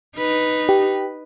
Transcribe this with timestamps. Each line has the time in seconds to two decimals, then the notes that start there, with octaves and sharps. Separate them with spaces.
0.17 D#4 B4
0.69 G4